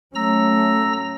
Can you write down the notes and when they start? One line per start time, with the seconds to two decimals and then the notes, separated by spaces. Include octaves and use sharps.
0.15 F#3 A3 C#4 A#5 E6 A#6